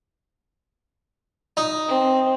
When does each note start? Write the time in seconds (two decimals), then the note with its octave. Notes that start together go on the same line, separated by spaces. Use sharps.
1.57 D#4
1.89 C4